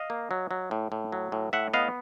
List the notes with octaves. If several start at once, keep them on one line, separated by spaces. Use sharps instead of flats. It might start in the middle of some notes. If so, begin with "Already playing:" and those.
Already playing: D#5 F5
A#3
F#3
F#3
A2
A2
F#3
A2
A2 E5 F#5
B3 D#5 F5